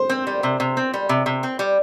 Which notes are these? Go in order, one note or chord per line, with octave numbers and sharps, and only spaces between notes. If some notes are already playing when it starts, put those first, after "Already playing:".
Already playing: C5
C4
G3
C3
C3
C4
G3
C3
C3
C4
G3